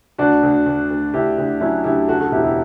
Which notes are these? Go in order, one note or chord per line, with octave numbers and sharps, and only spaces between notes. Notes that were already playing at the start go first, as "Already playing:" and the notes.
D2 D4 F#4
D2
D2
D2
D2 E4 G4
D2
F#3 C#4 E4
D2 E4 G4
C#3 F#4 A4
F#4 A4
E1 E4 G4
E4 G4